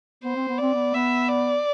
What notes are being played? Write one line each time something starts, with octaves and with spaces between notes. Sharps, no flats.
B3 C5
C4
B3
C4 D5
B3
B3 E5
D5